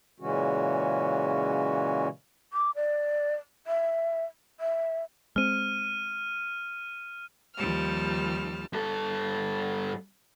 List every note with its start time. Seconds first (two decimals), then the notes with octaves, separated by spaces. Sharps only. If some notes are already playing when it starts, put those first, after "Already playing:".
0.20 A#2 C#3 E3 G#3 C#4 F#4
2.53 D6
2.76 D5
3.67 E5
4.60 E5
5.36 G#3 C4 F6 D#7
7.56 D#2 F3 G3 A5 F6
8.73 G2 A4